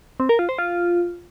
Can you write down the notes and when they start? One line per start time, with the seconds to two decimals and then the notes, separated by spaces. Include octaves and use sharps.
0.20 C4
0.29 A#4
0.39 F4
0.49 C5
0.58 F4